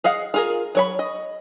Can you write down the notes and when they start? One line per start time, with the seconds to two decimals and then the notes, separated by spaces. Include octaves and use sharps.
0.04 G#4 D#5 F5 F#5
0.34 F4 G#4 A#4
0.75 F#3 C#5 B5
0.99 D#5